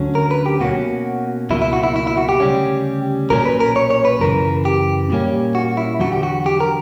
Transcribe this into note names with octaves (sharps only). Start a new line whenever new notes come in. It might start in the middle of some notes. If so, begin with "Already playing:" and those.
Already playing: D2 D3 F#3 C#4
A#4
B4
G4
B2 A#3 C#4 F#4
C#2 B2 F#3 A#3 E4
E4
F#4
E4
E4
E4
F#4
G4
D2 C#3 G3 C#4
B1 A#2 F#3 C#4 A#4
B4
A#4
C#5
C#5
B4
F#2 C#3 E3 A#4
G4
A#2 G3 A#3 C#4
F#4
E4
E2 D3 F#3 F#4
G4
F#4
G4
A#4